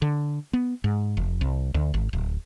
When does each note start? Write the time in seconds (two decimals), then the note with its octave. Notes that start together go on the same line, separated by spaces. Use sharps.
0.02 D3
0.53 B3
0.84 G#2
1.17 F1
1.41 C2
1.74 D2
1.94 G#1
2.13 D1